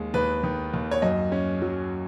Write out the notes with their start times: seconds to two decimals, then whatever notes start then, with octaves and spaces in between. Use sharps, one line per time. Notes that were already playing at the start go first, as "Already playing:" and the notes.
Already playing: D#2 G#3
0.14 D#2 B4
0.43 D#3
0.74 D#2
0.91 C#5
1.02 F#2 D#5
1.32 C#4
1.62 F#3